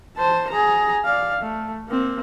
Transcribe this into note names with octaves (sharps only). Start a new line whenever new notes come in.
C5 A5
G#4 A#5
D5 F5
A3
A#3 C4